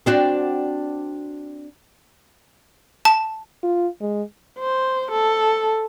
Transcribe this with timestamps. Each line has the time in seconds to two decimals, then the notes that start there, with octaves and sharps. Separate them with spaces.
0.06 C4 D4 F#4
3.05 A5
3.63 F4
4.01 G#3
4.59 C5
5.11 A4